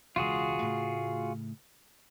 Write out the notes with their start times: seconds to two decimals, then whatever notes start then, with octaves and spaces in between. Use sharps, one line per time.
0.16 E1 C#2 F4 F#4 G#4
0.62 A2 C#3 A3